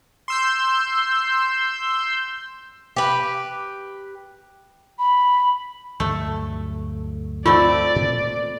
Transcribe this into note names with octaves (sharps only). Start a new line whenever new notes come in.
C6 E6 G6
G4 B4
B5
D2 G2 F#3 A3
A3 C4 F4 D5
A#2 B3